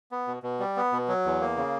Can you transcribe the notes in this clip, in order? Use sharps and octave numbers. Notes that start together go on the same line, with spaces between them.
B3
B2
B2
G3
B3
B2
F#3
E2
A#3
C#3